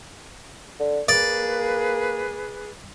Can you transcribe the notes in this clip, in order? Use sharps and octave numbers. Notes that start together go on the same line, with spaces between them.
D3
A#3 G#4 B4 D5